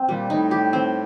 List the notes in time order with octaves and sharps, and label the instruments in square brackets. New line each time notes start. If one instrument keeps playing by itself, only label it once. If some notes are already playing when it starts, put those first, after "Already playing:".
Already playing: [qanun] C4
[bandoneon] A#2 [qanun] G3
[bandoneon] A2 [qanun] D#4
[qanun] G4
C4